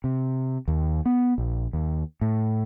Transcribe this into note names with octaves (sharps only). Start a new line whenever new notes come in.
C3
D#2
B3
A#1
D#2
A2